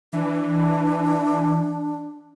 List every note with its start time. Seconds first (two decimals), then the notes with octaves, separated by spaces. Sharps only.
0.13 E3 D4